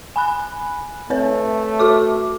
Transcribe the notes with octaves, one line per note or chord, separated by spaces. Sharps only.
G#5 B5 F#6
A3 C4 B4 C#5
F#4 A4 D6